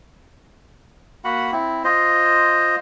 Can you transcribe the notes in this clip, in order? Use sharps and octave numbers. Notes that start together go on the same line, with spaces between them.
A#3 F#4 F#5 B5
C4 E4
F4 C5 D#5